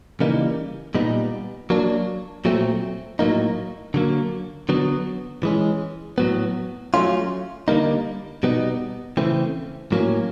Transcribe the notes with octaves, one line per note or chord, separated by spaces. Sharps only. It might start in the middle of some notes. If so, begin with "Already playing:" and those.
C#3 E3 G3 A#3 D#4
A#2 G3 B3 D#4
F#3 A#3 D4
A#2 F#3 A3 C4
A2 F#3 A#3 D#4
D3 F#3 A#3
D3 F#3 B3
E3 G#3 C#4
A2 F#3 B3
F#3 A3 C#4 F4
D3 G3 A#3 D#4
B2 G3 B3 D#4
C#3 E3 A3 C4
A2 F#3 A#3 C#4